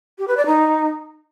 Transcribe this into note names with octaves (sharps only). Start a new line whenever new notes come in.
G4
B4
D5
D#4